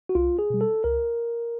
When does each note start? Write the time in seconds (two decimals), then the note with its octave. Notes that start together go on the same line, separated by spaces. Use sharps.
0.09 F#4
0.15 C2 F4
0.39 G#4
0.50 B2 G3
0.61 A4
0.84 C#2 A#4